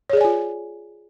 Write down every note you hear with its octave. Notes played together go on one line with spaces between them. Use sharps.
F4 G#4 C#5 D5 G#5